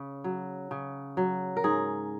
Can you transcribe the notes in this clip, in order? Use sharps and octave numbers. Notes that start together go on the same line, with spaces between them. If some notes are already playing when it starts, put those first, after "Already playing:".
Already playing: C#3
F#3
C#3
F#3
A#4
G#2 G#4